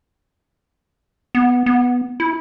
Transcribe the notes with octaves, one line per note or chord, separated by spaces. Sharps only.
B3
B3
E4